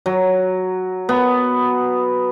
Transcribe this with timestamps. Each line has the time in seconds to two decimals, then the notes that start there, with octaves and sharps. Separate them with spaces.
0.06 F#3
1.09 B3